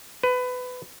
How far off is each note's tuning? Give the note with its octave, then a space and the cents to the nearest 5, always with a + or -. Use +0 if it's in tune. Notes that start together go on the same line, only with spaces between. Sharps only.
B4 +20